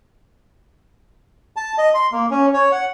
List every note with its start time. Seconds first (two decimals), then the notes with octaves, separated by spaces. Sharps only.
1.56 A5
1.78 D#5
1.94 C6
2.12 A#3
2.31 C#4
2.54 C#5
2.72 F#5